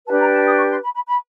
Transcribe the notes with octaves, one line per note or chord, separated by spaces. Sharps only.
D4 G4 B4 A5
A#5
A5
D#6
C#6
C6
B5
B5
B5